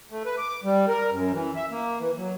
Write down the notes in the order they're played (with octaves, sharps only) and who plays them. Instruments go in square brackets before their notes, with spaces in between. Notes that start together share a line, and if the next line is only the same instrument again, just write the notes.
[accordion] A3
B4
D6
G3
A#4
F#2
E3
E5
A#3
E3
F#3